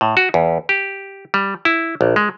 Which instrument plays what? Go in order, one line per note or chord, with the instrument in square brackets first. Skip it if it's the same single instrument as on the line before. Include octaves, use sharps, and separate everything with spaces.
[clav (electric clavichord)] A2
F#4
E2
G4
G3
E4
A#1
G#3